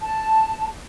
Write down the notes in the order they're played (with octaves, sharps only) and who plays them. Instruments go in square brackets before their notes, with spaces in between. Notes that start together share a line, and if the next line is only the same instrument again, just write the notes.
[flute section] A5